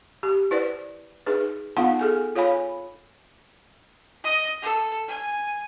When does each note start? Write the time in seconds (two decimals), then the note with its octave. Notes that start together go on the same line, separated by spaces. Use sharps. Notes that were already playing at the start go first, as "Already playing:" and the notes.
0.23 G4
0.51 E4 B4 C5 D5
1.26 D#4 G#4 B4
1.77 B3 D#4 F4 F5 F#5
1.99 G#4 A4 G#5
2.36 F4 C#5 F5 G#5 B5
4.24 D#5
4.62 A4
5.08 G#5